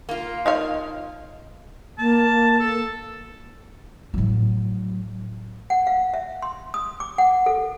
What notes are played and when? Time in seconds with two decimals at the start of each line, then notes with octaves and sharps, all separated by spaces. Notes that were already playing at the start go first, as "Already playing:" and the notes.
0.09 A#3 F4
0.46 D#4 C#5 F5
1.99 A#3 A5
2.60 A4
4.14 A2 F#3
5.70 F#5
5.87 F5
6.14 E5
6.42 C6
6.74 D#6
7.00 D6
7.18 F#5
7.46 A4